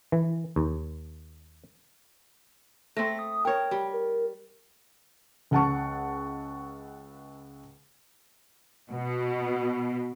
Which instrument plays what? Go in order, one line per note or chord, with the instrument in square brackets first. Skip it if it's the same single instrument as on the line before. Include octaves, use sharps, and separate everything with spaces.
[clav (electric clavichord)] E3
D#2
[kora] A3 C4 [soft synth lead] A#6
[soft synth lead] D#6
[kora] A#4 C#5 [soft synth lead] G5
[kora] G3
[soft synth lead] A#4
[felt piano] C#2 F#5 A5 C#6
[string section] B2